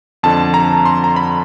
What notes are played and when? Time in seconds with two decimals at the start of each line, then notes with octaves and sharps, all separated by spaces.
0.23 F2 D3 A5
0.54 A#5
0.85 C6
1.04 A#5
1.16 B5